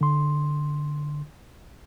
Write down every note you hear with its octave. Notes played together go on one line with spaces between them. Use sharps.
D3 C6